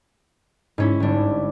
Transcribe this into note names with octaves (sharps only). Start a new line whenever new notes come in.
G#2 C#4 E4
G1 D4